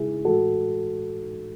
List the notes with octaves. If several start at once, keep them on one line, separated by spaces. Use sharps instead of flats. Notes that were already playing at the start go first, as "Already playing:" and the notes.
Already playing: E2 C#3 G#3 E4 G#4
A2 E3 G#3 F#4 A4